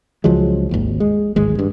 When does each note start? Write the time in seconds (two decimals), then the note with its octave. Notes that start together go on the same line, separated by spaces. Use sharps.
0.24 C#2 F3 F#3 G#3
0.71 G#1 D#2
1.00 G#3
1.36 D1 G#1 G#3
1.59 G2